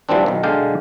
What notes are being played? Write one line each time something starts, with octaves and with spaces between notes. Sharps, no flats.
E3 F3 G3 B3 C4 D4
B1 D#3
B1 D3 G#3 D5 F5 G5